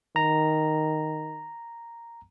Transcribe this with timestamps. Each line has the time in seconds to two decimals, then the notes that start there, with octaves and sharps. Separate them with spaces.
0.16 D#3 A#5